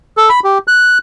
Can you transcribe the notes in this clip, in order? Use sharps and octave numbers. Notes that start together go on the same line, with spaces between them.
A4
B5
G4
F#6